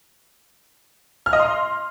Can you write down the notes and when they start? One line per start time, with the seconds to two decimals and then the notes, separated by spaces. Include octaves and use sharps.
1.26 F6
1.33 D#5
1.40 C6